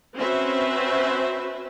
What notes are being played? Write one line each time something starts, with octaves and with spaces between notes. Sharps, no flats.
C4 C#4 F#4 B4 C5 E5